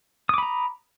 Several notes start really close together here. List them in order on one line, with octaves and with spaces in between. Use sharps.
D#6 D6 B5 A#5